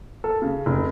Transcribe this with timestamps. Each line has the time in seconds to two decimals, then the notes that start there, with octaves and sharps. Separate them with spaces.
0.24 A4
0.42 C#3
0.66 F1